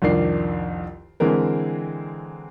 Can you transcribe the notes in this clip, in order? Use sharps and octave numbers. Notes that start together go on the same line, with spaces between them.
C2 F2 D#3 D4 C7
D3 E3 G#3 C4 A#4